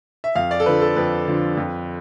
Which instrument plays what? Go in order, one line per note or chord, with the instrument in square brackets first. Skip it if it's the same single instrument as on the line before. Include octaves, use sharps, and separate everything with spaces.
[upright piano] E5
F2 F5
D5
A4
D3 F3 B4
A4
F2 B4
D3 F3
F2